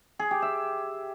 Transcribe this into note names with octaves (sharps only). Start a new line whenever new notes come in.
G#4
G4
E5